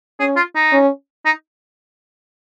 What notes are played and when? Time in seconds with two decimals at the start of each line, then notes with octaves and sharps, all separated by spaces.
0.20 C#4 G#4
0.36 F4
0.55 D#4
0.72 C#4
1.25 D#4